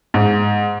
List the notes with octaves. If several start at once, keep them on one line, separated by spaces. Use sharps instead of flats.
G#2